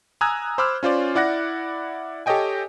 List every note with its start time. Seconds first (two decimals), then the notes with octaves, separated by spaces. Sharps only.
0.21 G#5 A#5 D#6 E6 F#6 G#6
0.58 C5 B5 D6 E6 F6
0.83 C#4 F4 C5 D5
1.15 E4 D5 F#5 F#6 A#6
2.26 G4 A4 C#5 D#5 G5 G#5